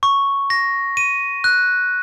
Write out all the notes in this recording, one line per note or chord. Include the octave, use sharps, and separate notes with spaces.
C#6
A#6
D#7
F#6